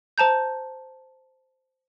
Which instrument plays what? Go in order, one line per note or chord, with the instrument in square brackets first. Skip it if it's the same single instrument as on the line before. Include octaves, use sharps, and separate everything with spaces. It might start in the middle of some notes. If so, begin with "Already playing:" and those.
[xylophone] C5 A5 A#5 G6